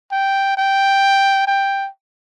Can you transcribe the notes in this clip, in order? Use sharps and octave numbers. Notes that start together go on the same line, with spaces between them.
G5
G5
G5